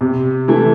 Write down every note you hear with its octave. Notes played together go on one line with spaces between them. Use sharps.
C3
E3 A3